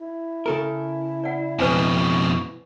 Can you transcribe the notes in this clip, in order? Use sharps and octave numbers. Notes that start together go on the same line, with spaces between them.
E4
C#3 A4 A#4
D5 F#5
F2 B2 B4 C5 G#5